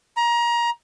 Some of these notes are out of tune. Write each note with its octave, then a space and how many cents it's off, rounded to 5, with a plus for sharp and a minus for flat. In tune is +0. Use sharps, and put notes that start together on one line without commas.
A#5 +25